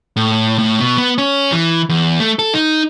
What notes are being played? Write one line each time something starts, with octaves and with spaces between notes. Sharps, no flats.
A2
A2
B2
B3
C#4
E3
E2
A3
A4
D#4